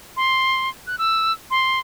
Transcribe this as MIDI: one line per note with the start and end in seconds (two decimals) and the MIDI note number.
0.17 0.70 84
0.87 0.98 90
0.98 1.32 88
1.51 1.79 84